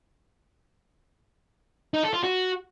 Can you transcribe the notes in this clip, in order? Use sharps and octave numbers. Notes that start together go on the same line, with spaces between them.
D#4
A4
F4
F#4